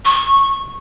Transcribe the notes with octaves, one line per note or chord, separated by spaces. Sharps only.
C#6